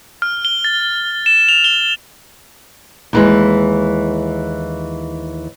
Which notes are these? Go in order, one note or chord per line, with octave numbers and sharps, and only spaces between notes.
F6
G7
A6
E7
F7
G7
D#2 E3 G#3